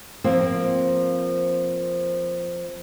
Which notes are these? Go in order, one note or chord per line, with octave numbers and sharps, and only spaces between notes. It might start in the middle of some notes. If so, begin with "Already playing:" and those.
F3 A#3 C4